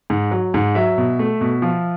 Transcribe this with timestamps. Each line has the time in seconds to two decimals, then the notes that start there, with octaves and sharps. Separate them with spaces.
0.10 G#2
0.32 F#3
0.54 G#2
0.75 F#3 E5
0.98 B2
1.19 A3
1.41 B2
1.62 F3